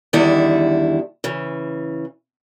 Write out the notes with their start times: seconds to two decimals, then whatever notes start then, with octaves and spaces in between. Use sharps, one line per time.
0.13 E2 D3 D#3 G3 E4
1.24 C#3 E3